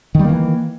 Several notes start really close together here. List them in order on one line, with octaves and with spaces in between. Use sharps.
D#3 G3 A#3 E3